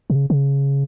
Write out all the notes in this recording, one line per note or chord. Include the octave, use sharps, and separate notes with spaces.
B2
C#3
C#3